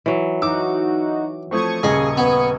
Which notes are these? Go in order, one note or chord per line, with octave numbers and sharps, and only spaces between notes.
E3 F#3
D#4 F#4 D6 E6
F3 A3 C4 C#6 D#6 G#6
D#1 C#3 G#4 D#5
B3